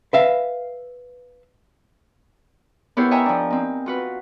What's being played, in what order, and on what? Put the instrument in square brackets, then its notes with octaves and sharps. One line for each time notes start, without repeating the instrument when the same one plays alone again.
[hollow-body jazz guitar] B4 E5 F5
[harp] B3 E4 G4 A#4 C5 C#5
C#5 D#5 E5 G5 G#5 A#5
F3 D4
C4 D#4
F4 F#4 B4